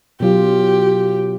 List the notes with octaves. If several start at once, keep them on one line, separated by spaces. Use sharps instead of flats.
B2 F#3 F4 G4